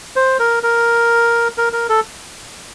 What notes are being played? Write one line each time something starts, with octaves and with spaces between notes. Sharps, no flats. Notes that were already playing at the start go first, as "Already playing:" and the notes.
C5
A#4
A#4
A#4
A#4
A4